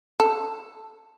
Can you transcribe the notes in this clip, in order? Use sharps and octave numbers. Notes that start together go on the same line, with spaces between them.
A4